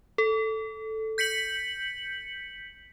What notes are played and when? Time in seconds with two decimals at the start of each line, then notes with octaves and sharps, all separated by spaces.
0.18 A4
1.18 G6 B6 C#7 F#7